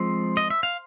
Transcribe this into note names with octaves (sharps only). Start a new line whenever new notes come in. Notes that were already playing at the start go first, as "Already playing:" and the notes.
Already playing: F3 G#3 C4 C5
D#5
E5
F5